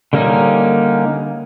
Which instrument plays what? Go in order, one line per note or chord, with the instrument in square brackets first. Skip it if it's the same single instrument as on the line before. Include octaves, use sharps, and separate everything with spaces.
[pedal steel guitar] D3 G3 A#3 C#4 D#4